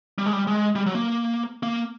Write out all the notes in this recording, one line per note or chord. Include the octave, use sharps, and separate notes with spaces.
G3
G#3
G3
G#3
G3
F#3
A#3
A#3